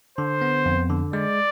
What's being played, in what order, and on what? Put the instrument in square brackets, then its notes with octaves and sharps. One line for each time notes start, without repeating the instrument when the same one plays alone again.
[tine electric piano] D3 [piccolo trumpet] C5
[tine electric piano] B3
F2
D3
[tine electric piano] G#3 [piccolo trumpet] D5